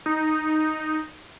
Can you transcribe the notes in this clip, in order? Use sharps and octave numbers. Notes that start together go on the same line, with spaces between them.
D#4